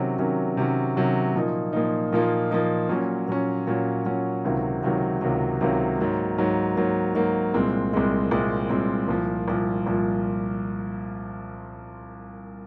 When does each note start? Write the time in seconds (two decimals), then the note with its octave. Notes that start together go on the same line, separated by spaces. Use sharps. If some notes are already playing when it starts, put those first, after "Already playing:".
Already playing: C3 D#3 F#3 C#4
0.19 C3 D#3 F#3 C#4
0.57 C3 D#3 F#3 C#4
0.96 C3 D#3 F#3 C#4
1.35 A#2 F3 A#3 D#4
1.73 A#2 F3 A#3 D#4
2.13 A#2 F3 A#3 D#4
2.51 A#2 F3 A#3 D#4
2.89 A#2 F#3 C#4
3.28 A#2 F#3 C#4
3.67 A#2 F#3 C#4
4.05 A#2 F#3 C#4
4.44 C#2 C3 D#3 F#3
4.82 C#2 C3 D#3 F#3
5.21 C#2 C3 D#3 F#3
5.61 C#2 C3 D#3 F#3
5.99 G#2 F#3 A#3
6.38 G#2 F#3 A#3
6.76 G#2 F#3 A#3
7.15 G#2 F#3 A#3
7.54 C2 A#2 G#3 C4
7.93 C2 A#2 G#3 C4
8.31 C2 A#2 G#3 C4
8.69 C2 A#2 G#3 C4
9.08 C2 A#2 F3
9.48 C2 A#2 F3
9.86 C2 A#2 F3